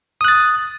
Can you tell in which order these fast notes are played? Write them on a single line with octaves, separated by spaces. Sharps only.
D#6 F#6 A6